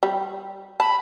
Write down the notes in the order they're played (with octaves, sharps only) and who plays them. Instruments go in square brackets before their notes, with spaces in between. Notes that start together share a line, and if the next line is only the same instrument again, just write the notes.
[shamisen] G3
[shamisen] A5 [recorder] B5